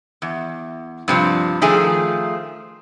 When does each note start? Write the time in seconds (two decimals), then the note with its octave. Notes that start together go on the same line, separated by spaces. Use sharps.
0.22 E2
1.08 G2 C3 F3
1.61 D#3 F3 A3 G#4